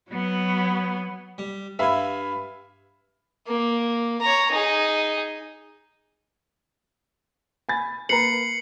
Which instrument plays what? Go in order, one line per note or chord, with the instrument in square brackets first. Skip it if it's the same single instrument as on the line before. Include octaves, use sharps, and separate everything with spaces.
[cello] F#3 B3
[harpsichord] G3
[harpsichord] G2 G#5 [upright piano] E5 F5 B5
[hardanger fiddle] A#3
C#5 A#5
D#4 G#4
[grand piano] G#5 B5 A6
[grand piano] A#3 B4 A#5 [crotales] C7 C#7 F#7